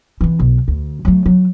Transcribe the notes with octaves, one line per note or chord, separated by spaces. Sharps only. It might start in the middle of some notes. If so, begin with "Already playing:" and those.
E3 C4
B1
D2
F#3 A3
F#3